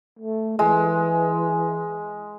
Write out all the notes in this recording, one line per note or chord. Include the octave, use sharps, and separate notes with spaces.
A3
E3 G#3